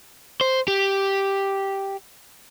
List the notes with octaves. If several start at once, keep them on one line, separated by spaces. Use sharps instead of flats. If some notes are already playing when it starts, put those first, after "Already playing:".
C5
G4